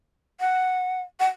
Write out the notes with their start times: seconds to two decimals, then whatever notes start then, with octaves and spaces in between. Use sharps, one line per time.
0.40 F#5
1.20 F#5